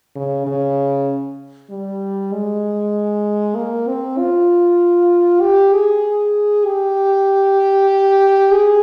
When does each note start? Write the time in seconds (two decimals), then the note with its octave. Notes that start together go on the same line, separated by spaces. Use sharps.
0.16 C#3
0.47 C#3
1.70 G3
2.32 G#3
3.56 A#3
3.88 C4
4.18 F4
5.42 G4
5.74 G#4
6.66 G4
8.52 G#4